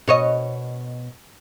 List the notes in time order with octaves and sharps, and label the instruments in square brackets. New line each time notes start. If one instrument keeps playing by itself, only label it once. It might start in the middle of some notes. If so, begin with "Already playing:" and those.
[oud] B2 C#5 D#5